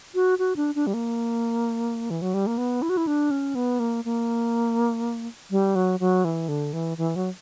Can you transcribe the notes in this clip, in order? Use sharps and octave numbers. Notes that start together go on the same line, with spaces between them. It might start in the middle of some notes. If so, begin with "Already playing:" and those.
F#4
F#4
D4
D4
G3
A#3
E3
F#3
G3
A#3
B3
E4
F#4
E4
D4
C#4
B3
A#3
A#3
G3
F#3
F#3
E3
D3
E3
E3
F#3